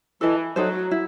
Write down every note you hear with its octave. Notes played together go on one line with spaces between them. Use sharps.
E3 A4 D#5 A5
F#3 D#4 A4 C5
E4